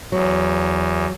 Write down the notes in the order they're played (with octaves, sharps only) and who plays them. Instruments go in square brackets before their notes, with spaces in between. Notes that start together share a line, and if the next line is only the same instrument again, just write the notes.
[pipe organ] E2 [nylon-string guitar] F#3